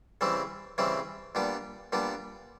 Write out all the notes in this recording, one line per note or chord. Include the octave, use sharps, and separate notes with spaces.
C#3 E3 G3 C4 E4
C#3 E3 G3 C4 E4
A#2 G3 B3 D4
A#2 G3 B3 D4